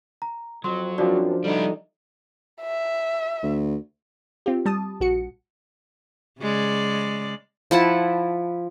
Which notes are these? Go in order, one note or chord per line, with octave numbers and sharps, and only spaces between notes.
A#5
F2 F#3 C6
G#1 F#2 F3 C4 D4 F#4 D5
A1 D3 G3 D#4 E4
E5
D2
C4 F4 G4
G3 A5 D#6
A#1 F#4 C#7
C#3 G#3 D5
F3 E4 F#5 A5